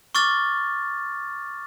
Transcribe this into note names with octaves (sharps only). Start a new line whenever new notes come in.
C#6 D6 F6 A6